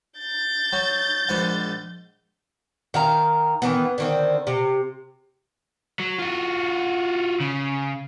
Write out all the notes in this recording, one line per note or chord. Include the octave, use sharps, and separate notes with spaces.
G6 A6
F#3
A#1 G#2 F#5
D#3 F5 A#5
D#3 E3 B3
D3 D#3 C4
C3
F#3
F4 F#4
C#3